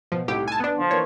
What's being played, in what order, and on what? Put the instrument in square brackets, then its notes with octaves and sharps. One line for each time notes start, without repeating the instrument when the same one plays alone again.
[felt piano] B2 [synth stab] F3
[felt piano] C2 A2 D#4 [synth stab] G4
[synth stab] G#5 A5
B3 D4
[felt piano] D3 [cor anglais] F3
[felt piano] E3 A#3 D4 [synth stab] C#5